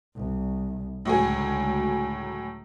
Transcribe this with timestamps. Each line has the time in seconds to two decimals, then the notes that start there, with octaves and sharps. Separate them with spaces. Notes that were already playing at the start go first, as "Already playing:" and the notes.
0.15 C2
1.05 C#2 A2 D3 F#3 G#4